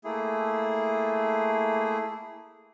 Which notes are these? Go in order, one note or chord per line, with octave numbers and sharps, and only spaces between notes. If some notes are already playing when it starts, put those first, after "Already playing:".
A3 A#3 E4 G#4